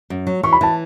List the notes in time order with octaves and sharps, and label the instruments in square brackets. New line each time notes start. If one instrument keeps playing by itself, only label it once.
[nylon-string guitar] F#2
F#3
[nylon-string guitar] E3 [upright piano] C#6
[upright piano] B5
[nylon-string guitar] E3 [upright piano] A5